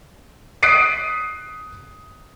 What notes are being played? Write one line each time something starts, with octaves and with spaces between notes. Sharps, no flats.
D#6 F#6 B6 C7 D7 D#7